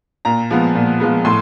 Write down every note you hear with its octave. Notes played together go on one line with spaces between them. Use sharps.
A#2 A#5
F3 G#3 B3
A#2
F3 G#3 B3
A2 C6